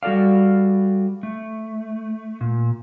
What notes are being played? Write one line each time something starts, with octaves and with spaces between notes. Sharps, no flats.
G3 F#4 A4 D5 F5
A3
A#2